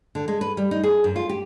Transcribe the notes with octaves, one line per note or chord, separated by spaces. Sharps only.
D3
G#3
B4
G3
D#4
G#4
F#2
F4
G4